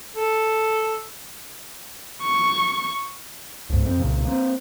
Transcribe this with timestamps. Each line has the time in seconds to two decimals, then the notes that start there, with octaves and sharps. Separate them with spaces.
0.16 A4
2.23 C#6
3.70 C#2 G#2
3.84 F2 C4
3.98 C2 A#2 C#3
4.25 A#3 C4